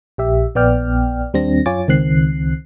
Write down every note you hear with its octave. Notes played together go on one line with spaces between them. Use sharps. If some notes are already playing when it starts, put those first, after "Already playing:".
A#1 G4 E5
A#1 B3 D5 G5 F6
D#2 G3 C4 D4 A#6
F#2 F4 C#5 G#5 D6 A6
C#2 D#3 C4 F#6 C7